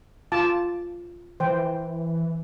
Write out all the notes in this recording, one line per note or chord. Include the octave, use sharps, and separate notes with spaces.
F4 A5 D6
E3 C5 G5